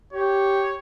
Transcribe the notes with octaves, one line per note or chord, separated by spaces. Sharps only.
G4 C#5